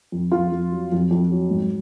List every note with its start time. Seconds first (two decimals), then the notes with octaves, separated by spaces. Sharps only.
0.12 F2
0.32 F2 F4
0.52 F2
0.72 F#3
0.92 F2
1.11 F2
1.31 F#3
1.50 G#2